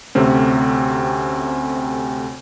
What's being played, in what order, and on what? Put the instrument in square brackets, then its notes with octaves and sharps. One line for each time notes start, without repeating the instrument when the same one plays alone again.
[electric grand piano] D2 C3 A3 C4 C#4